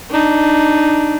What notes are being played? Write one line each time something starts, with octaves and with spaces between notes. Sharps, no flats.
D4 D#4